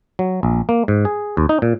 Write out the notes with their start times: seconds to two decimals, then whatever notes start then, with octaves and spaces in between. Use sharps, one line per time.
0.19 F#3
0.43 A#1
0.69 A#3
0.88 G#2
1.05 G#4
1.37 D#2
1.49 D#4
1.62 A#2